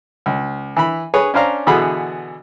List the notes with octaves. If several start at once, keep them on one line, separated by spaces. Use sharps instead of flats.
C#2
E3 B5
G#4 B4 C#5
C#4 D4 C5 F5 A#5
B2 D3 E3 B3 G#4 B5